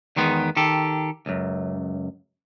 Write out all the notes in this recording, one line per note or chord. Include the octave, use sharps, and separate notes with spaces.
E2 D#3 G#3 B3
D#3 G4 A4
C#2 F#2